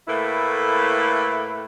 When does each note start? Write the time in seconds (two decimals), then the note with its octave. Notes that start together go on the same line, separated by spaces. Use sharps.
0.08 A2 A3 A#3 E4 B4